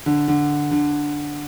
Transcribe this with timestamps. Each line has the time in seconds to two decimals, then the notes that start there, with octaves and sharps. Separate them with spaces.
0.06 D3
0.28 D3
0.71 D3